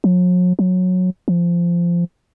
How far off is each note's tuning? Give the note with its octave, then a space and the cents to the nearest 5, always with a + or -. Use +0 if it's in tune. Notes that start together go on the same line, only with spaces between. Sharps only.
F#3 -45
F#3 -15
F3 -15